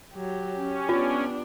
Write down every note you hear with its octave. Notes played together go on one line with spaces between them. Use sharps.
F#3 G4
C#4
B3 D4 F4